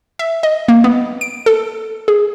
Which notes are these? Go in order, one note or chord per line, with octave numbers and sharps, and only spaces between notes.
E5
D#5
A#3
B3
D7
A4
G#4